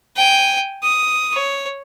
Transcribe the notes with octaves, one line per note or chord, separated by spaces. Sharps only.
G5 G#5
D#6
C#5